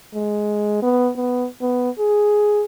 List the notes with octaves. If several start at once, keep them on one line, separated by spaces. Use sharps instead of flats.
G#3
B3
B3
B3
G#4